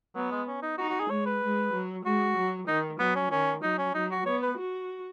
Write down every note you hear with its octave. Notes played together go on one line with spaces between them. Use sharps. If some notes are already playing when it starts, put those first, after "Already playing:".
F#3 B3
G#3
C#4
D#4
D#4 F#4
F#4
G#4
G#3 C#5
B4
G#3
F#3
G#3 F#4
F#3
D#3 D#4
F#3 B3
C#4
D#3 C#4
F#3 D#4
C#4
F#3 D#4
F#4
B3 C#5
B4
F#4